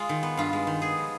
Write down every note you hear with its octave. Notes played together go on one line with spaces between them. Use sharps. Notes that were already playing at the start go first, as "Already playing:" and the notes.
Already playing: G#3 F4
D#3
B3
G2 F4
G#3
D#3
B3 G#4
F3